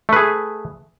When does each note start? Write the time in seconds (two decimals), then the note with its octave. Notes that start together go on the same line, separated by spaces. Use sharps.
0.09 A3
0.13 B4
0.16 G#4